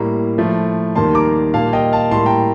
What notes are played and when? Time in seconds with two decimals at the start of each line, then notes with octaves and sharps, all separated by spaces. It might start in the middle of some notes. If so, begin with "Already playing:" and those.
Already playing: A2 G3 A#3 A#5
0.38 A2 F3 A3
0.95 D#2 D#3 G3 A#3 A5 C6
1.15 A#5 D6
1.54 A#2 G3 A#3 F5 A5
1.73 D#5 G5
1.92 F5 A5
2.11 A2 G3 A#3 A5 C6
2.26 G5 A#5